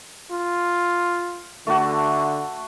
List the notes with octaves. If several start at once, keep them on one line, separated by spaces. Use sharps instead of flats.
F4
D3 A3 F#4